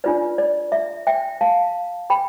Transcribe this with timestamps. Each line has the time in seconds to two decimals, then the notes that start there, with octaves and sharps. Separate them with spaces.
0.04 D4 F4 B4 D5
0.38 D5
0.72 E5
1.07 E5 G5
1.41 F5 A5
2.10 G5 B5